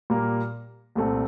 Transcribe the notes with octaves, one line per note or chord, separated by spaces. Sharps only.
A#2 G3 A#3
C2 A#2 A3 C4